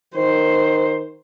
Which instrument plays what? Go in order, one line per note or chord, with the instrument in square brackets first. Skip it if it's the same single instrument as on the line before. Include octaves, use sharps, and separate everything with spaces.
[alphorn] D#3 [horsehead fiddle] C5